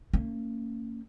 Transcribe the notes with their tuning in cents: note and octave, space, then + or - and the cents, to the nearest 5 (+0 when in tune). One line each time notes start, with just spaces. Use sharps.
A#3 -35 C#4 +0